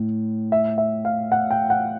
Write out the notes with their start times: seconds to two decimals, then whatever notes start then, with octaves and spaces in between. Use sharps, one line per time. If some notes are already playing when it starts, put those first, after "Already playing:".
Already playing: A2
0.52 E5
0.78 E5
1.05 F5
1.32 F#5
1.51 G5
1.70 F#5